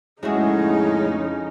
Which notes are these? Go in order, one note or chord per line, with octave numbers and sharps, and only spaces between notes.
F2 A2 C#3 G#3 A3 C#4 D#4 F#4